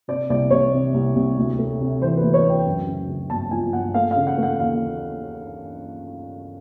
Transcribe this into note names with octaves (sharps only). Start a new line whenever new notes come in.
C3 D5
C2 D5
C2 C#5
C3
C2
C2
D2
A3
C3
E3 C5
B4
D2
C#5
D2 G5
F#2
C#3
C#3
G1 A5
F3 G#5
G1 F#5
A3 F5
F5
C#3
F#5
A3 F#5
D#2 F5